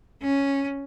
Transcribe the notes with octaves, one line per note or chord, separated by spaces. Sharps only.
C#4